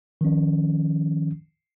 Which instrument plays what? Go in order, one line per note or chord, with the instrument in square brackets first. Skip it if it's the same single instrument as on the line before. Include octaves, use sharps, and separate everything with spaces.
[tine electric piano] D#3 F3 C#4